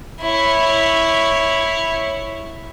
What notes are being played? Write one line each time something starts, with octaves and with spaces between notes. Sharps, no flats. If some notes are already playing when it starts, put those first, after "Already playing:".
E4 C#5